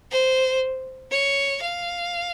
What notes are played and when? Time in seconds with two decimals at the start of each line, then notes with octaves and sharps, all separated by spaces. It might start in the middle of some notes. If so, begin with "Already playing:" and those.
0.11 C5
1.11 C#5
1.61 F5